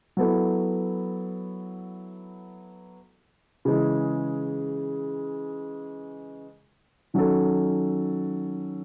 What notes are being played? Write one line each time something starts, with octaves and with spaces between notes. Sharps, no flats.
F#3 B3 E4 A4
C#3 E3 G#3
D#3 F#3 C#4 F#4 A4